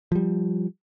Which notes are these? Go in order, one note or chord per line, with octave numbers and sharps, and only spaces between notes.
F3 G3